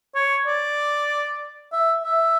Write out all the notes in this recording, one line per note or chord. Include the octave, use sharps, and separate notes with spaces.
C#5
D5
E5
E5